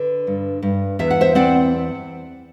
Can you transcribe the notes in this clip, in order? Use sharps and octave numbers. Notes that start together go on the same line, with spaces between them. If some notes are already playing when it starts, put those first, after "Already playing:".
Already playing: D3 B4
G2
G2
E2 E5
F#5
C5 E5
C4 D5 F#5